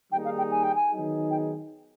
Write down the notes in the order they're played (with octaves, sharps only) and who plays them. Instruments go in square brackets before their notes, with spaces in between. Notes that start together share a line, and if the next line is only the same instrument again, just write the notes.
[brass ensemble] D#3 G3 A#3 D#4 G#4 [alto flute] G5
[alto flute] F5
G5
G#5
G5
G#5
[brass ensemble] D#3 F#3 B3 D#4 G#4
[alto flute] G5